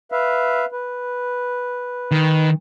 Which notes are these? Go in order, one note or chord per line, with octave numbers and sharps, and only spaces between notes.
B4 E5 F5
B4
D#3